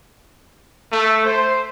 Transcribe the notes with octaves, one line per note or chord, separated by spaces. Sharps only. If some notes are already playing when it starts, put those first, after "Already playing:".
A3
C5